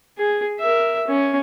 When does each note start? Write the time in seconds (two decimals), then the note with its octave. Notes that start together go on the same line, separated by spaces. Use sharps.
0.18 G#4
0.60 A#4 E5
1.07 C#4